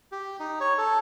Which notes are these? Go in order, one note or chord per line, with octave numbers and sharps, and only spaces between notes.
G4
D#4
C#5
A4